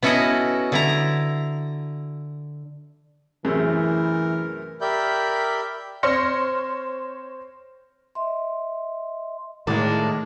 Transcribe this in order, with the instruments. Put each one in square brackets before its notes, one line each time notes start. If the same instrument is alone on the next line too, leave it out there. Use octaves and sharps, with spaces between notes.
[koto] B3 C#4 E4 F#4 A4 D#5
D3 E4 A#5
[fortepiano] F#2 A2 C3 [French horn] E3 [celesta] G#4 E6 [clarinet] A#4
[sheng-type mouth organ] G4 A#4 D5 E5 B5 G6
[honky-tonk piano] C4 C#5 C6 F6 A#6 C#7
[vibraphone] D#5 E5 C6
[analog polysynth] A2 [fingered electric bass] D#3 [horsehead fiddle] G#3 [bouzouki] A#3 D4